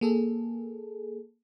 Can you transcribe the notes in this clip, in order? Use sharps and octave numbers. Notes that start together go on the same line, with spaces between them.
A#3 G#4 A4